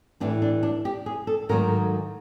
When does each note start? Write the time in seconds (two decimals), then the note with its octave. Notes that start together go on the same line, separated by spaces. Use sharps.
0.20 A2 E3 G3 D4
0.42 D4
0.63 D4
0.85 G4
1.06 G#4
1.27 A4
1.49 G#2 D#3 F#3 A3 A#4